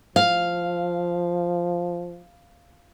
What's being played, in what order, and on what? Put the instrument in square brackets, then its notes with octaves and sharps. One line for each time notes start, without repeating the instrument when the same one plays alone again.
[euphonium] F3 [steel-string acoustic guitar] F5